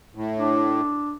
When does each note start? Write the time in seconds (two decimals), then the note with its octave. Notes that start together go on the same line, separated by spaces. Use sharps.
0.15 A2
0.37 D4